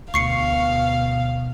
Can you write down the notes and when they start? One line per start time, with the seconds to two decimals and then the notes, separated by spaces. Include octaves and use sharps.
0.14 D2 B2 F5 C#6 C7 C#7